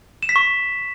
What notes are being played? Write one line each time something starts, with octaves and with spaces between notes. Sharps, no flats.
E7
B6
C#6